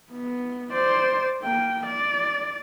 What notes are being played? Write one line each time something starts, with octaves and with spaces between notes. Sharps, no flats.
B3
C5 D5
A#3 G5
D5